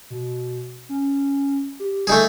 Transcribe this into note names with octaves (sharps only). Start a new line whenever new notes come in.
B2
C#4
G4
G3 A3 D#4 G#4